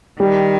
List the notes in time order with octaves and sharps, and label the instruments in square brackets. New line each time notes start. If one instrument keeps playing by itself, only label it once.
[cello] D#3 [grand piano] G3